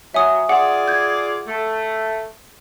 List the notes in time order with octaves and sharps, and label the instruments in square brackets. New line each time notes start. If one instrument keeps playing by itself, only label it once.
[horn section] F#3 [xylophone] E5 G#5 D#6
[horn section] F4 G#4 D5 [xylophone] F#5
[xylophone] G6 G#6
[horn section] A3